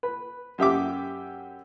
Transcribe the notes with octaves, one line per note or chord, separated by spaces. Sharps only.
B4
F#2 G4 E5 D6